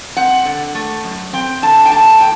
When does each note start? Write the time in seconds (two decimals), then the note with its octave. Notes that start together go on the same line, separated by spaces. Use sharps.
0.16 C4 F#5
0.45 D3
0.75 A3
1.04 F#2
1.33 C4 G5
1.62 D3 A5
1.85 G5
1.91 A3 A5
2.20 A#2 G5